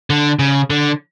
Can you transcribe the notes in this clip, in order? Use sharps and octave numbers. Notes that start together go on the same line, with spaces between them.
D3
C#3
D3